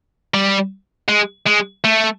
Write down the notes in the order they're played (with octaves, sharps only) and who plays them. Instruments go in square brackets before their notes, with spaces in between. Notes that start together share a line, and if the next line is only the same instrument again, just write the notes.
[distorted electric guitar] G3
G#3
G#3
A3